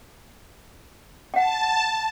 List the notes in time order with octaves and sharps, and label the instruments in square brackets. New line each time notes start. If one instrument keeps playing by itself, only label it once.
[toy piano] F#5 G5 [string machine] A5